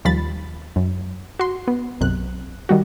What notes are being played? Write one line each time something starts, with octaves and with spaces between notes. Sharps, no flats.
D#2 F3 G3 B5 A6
F#2
F#4 C6
B3
B1 F#2 C3 F#6
D#3 G3 F#4